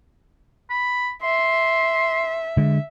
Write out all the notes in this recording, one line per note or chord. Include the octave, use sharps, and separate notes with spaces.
B5
E5 C6
D3 G#3